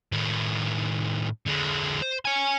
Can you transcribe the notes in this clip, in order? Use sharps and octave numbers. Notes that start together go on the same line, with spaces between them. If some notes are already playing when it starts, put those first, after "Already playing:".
A2 D#3
D3 G#3
C5
C#5 G#5